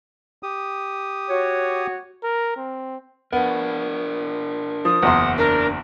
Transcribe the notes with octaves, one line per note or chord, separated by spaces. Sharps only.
G4 D#6
F#4 C#5
A#4
C4
B3 D4 A#4
F3 D#6
F#1 E2 F#5 C6
D4 A#4